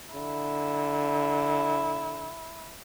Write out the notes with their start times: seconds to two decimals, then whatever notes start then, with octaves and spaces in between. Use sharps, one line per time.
0.15 D3 E4